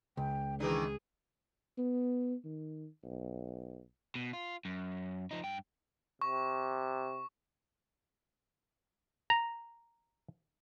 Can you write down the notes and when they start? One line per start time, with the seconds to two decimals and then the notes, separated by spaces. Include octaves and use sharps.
0.17 C#2 G5
0.60 D#3 E3 D4 D#4 G#4
1.78 B3
2.44 D#3
3.04 B1
4.15 B2
4.33 F4
4.65 F#2
5.31 F3 D#4
5.44 G2 G5
6.22 C3 C#6
9.30 A#5